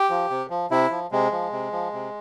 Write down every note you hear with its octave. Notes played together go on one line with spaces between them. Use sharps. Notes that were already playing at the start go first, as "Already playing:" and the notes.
Already playing: G4
F3
C3
F3
C3 E4
F3
C3 G#3
F3
C3
F3
C3